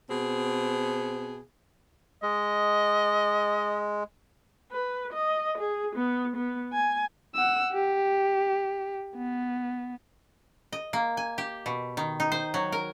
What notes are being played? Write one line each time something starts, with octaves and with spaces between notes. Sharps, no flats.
B2 C4 G#4
G#3 D#5
B4
D#5
G#4
B3
B3
G#5
F#5 E6
G4
B3
D#5
A#3
G#5
G4
B2
D#3
D#4
C5
F#3
A#4